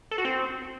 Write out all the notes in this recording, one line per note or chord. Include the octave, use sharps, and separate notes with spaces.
A4
F#4
C4